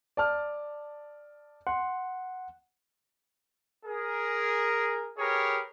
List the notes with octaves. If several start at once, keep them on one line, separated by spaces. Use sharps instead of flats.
D5 A5 F6
F#5 C6
G#4 A#4
G4 G#4 A#4 B4 C#5